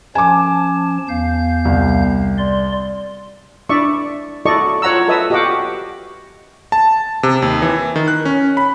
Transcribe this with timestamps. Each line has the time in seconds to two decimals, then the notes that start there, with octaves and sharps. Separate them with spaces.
0.15 F3 C#4 G#5 A5 D6
1.09 E2 F5 G6
1.65 C2
2.38 D5 C6
3.69 D4 E4 D5 E5 C#6
4.45 E4 F#4 A4 D5 D#5 C#6
4.82 F4 C#5 F#5 A#5 E6
5.08 A4 B4 D#5 E5 D#6 E6
5.30 F#4 G4 D#5 F5 F#5 D6
6.72 A5
7.23 C3
7.42 D#2
7.62 E3
7.96 D#3
8.08 F#6
8.25 C#4
8.57 B5